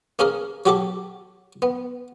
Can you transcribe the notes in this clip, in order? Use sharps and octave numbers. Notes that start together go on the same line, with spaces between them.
A#3 C#4 G#4 A#4
F#3 F#4 G4 A4 D6
B3